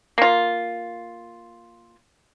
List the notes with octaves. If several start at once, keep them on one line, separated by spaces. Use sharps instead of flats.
A#3 F4